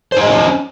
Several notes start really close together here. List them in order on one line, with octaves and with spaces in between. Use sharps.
C5 D#4 D#5 F#4 C#4